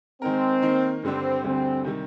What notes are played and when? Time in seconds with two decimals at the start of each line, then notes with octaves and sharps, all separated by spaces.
0.22 D#3 G#3 C4 D#4 A#4
0.62 D#3 A#3 D#4 A#4
1.03 G2 D3 G3 C4 D4
1.44 D2 D3 G3 C4
1.84 C3 D#3 G3